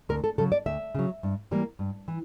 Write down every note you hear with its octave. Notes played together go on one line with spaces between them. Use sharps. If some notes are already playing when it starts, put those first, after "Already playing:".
D2 A#4
A4
C#3 F#3 A4
D5
D2 E5
C#3 F#3
G2
E3 G3 A#3
G2
E3